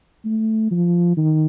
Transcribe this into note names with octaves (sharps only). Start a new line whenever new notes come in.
A3
F3
D#3